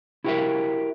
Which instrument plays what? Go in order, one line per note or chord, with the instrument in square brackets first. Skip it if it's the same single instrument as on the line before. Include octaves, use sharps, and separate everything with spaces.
[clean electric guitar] E4 F#4 G4 A4 A#4 E5